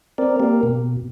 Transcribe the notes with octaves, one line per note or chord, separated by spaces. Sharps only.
C4 A#4 D5
A#3 G4 A#4
B2